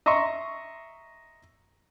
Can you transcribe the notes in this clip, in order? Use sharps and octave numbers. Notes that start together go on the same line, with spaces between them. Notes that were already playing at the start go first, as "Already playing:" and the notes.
D#5 E5 A#5 C6 C#6